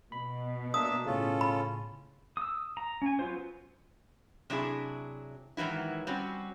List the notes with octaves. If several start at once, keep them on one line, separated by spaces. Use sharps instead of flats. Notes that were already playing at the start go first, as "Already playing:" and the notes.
B2 B5
A#3 D4 E5 D#6
A2 C#3 C#4 F4 A4
B5
D#6 E6
A#5
C#4 G#5
F#3 B3 F4 C5
C3 F#3 D4 E4 G#4
G#2 D#3 E3 F#3 E4
G3 C4 C#4 F#4